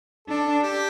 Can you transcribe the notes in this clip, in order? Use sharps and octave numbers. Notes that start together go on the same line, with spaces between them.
D4 A4
G4